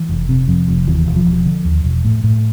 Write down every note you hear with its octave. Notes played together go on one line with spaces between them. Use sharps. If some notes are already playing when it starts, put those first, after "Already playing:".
Already playing: E3
F1
C3
F2
F1
D#2 E3
E1
F3
E1
D3
D#2
E1
A2
A2